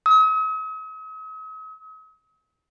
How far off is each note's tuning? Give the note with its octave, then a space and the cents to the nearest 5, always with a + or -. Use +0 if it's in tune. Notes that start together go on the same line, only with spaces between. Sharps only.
D#6 +45